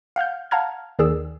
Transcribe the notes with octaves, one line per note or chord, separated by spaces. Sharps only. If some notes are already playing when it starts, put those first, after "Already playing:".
F5 F#5 F6 G6
F5 F#5 A5 A#5 F6 G#6
D#2 D#3 G#4 D5 E6